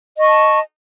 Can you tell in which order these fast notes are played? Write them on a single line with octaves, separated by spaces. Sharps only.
D#5 C#6 A5